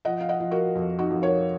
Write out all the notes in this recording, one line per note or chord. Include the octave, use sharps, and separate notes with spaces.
F3 D#5 F#5
F5
D#5 F#5
F3
F#4 A#4
F2
D#4 F#4
F2
A#4 C#5